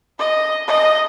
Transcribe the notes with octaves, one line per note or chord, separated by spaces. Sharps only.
D#5
D#5